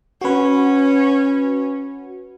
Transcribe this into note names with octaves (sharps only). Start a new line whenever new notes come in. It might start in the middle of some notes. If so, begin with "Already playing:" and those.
C#4 F#4 B4